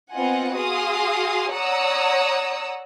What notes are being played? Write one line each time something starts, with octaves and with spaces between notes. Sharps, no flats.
B3 C4 F4 D#5 F#5 G#5
F#4 G#4 F5 C6 D#6
C#5 D5 F#5 A#5 D#6 E6